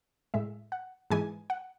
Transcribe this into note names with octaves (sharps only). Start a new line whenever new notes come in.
A2 G#3 E5
F#5
G#2 E3 G#3 G#5
F#5